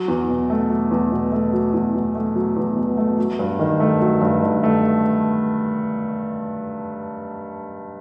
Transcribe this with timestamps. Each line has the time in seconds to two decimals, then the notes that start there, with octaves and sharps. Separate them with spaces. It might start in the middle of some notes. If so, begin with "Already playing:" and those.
Already playing: F#3
0.08 E2
0.29 B2
0.50 A3
0.70 F#3
0.91 E2
1.11 B2
1.32 A3
1.53 F#3
1.74 E2
1.95 B2
2.15 A3
2.36 F#3
2.56 E2
2.77 B2
2.97 A3
3.18 F#3
3.39 G2
3.59 D#3
3.80 A3
4.01 F#3
4.21 G2
4.42 D#3
4.63 A3